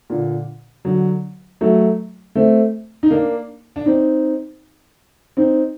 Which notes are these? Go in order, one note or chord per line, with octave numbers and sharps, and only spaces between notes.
A#2 D3
D3 F#3
F#3 A3
A3 C4
D#4
A#3 D4
D4
C4 D#4
C4 D#4